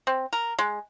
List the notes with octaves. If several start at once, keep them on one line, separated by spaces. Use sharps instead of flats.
C4
A#4
G#3